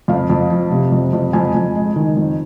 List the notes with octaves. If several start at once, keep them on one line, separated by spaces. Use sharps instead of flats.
F2 F5
F2
F3
C3
F2
F2
F2 G#5
F2
G#3
D#3
F2